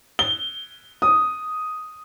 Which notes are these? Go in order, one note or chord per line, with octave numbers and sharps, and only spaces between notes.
G7
D#6